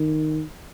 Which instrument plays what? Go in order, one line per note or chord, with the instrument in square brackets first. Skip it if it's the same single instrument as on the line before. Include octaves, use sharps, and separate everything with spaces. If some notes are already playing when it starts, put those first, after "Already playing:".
Already playing: [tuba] D#3